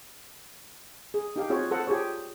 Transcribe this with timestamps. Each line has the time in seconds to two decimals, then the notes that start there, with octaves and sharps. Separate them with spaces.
1.14 G#4
1.36 D#4 G4 F5
1.50 C4 F4 F#4 G#4 C#5
1.71 A4 C5 F#5
1.87 F4 G4 G#4 C5 C#5